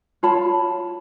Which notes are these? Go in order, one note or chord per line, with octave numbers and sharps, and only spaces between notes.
F4 C#5 A5 B5